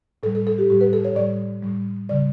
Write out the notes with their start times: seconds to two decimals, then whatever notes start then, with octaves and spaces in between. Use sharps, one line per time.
0.23 A2 A4
0.26 G3
0.35 A4
0.47 A4
0.58 G4
0.70 A2 G3 G4
0.81 B4
0.93 A4
1.05 C#5
1.16 A2 G3 D5
1.63 A2 G3
2.09 C#3 G3 D5